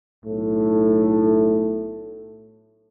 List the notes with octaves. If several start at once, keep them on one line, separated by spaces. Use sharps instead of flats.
B1 A2 A3